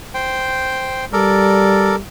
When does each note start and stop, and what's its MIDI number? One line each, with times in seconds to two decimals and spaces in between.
0.14 1.05 72
0.14 1.05 79
1.13 1.99 55
1.13 1.96 69
1.13 1.96 70
1.13 1.96 74